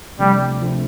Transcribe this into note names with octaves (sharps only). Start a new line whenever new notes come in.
C3 F3 G3 A3 D4
C3 F3 A3 D4